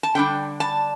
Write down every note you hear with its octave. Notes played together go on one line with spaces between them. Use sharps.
A5
D3 G3 B3 D4 G5
A5